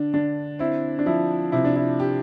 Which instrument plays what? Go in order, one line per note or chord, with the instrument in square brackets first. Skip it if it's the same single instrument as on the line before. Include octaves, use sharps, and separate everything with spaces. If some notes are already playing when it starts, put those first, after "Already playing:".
Already playing: [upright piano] D3 [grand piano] D4
[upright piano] D3 [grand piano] D4
[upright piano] C4 [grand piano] E4
[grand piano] D4
[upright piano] F3 [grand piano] E4
[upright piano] C3 [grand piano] E4
[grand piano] D4
E4
[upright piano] G4